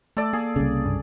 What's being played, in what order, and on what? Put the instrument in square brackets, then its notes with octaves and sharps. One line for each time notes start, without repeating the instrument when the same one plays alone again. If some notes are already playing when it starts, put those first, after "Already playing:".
[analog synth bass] A3 [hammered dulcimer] A4 D5
[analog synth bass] A#3 [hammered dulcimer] G#4
[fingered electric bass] C2 C#3
[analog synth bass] G2